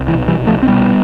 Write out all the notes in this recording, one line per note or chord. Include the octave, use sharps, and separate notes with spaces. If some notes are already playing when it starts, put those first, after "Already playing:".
Already playing: C2
E3
B2
E3 G3
C2
F3 A3
C4
B2 G3 B3